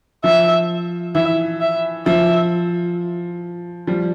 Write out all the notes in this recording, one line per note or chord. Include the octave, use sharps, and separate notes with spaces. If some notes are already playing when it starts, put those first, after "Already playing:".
F3 E5
E3 E5
E5
F3 E5
F3 G3